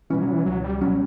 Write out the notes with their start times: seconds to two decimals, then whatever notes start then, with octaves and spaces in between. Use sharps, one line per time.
0.10 B2 E3 G3 C#4
0.22 F#3
0.33 E3
0.46 C#2 F#3
0.64 G3
0.81 B2 F#3 G3 C#4